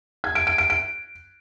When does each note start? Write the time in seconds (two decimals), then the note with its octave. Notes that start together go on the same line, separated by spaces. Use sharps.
0.24 G#6
0.35 D7
0.47 D7
0.58 D7
0.70 D7